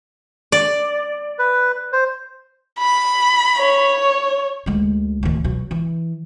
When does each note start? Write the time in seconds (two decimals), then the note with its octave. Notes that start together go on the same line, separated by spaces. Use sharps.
0.52 D5
1.39 B4
1.93 C5
2.79 B5
3.58 C#5
4.66 D2 G#3
5.23 D1 D#3
5.44 B2 F#3
5.71 E3